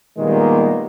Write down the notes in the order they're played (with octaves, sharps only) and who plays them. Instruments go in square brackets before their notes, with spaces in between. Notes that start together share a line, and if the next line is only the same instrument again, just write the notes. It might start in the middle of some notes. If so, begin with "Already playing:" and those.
[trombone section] A#2 D#3 G3 G#3 A#3 B3